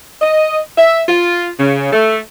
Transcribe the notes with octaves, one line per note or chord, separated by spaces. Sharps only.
D#5
E5
F4
C#3
A3